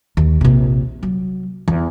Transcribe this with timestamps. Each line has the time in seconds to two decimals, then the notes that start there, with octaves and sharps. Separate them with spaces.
0.17 D#2
0.41 A#1 C3
1.03 F#3
1.68 E2